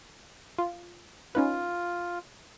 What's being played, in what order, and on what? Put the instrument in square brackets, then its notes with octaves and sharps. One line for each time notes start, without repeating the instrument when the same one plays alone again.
[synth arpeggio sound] F4
[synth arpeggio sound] C#4 D#4 B4 [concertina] F4